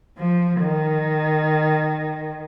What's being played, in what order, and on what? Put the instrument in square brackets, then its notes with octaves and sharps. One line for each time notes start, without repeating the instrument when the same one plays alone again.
[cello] F3
D#3